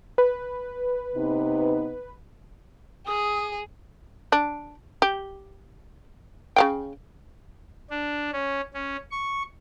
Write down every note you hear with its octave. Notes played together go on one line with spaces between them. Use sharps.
B4
C3 B3 D#4
G#4 D#6
D4
G4
C#3 F5 G5
D4
C#4
C#4
C#6